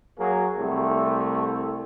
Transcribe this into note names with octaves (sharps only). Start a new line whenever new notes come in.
F#3 A#3 G#4
C2 A3